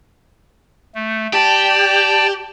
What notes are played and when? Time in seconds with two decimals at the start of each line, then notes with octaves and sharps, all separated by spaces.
0.95 A3
1.33 G4 D5 G5 A5